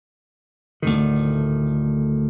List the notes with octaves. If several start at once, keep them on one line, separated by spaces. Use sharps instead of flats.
D2 A2 D#3